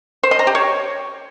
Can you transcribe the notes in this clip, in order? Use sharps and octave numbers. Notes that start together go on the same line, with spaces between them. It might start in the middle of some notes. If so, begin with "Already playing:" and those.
C5
D#5
A#5
G4
C#5